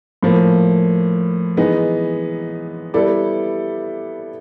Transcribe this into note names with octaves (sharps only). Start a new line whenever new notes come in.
A2 F3 A#3
E3 G#3 B3 D#4
G3 B3 E4 A4 D5